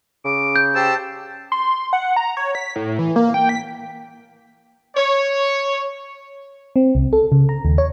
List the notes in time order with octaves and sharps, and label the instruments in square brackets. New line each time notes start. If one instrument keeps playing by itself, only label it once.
[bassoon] C#3 [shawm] D6
[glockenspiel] G6
[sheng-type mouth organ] G4 C5 E6 [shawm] A5
[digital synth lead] C6
F#5
A#5
C#5
B6
A2
E3
A#3
G5
B6
[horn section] C#5
[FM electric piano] C4
C2
A4
C#3
A#5
D#2
C#5